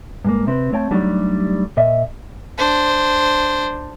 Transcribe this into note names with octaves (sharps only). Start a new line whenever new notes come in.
G2 G#3 A#3
C3 C4 B4
A3 C4 C#5 G5 A5
F#3 G3 A3 D4 D#4 G4
A#2 D#5 E5
D4 C5